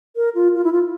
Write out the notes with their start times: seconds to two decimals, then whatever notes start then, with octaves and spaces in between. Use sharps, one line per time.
0.16 A#4
0.35 F4
0.55 F4
0.64 E4
0.73 F4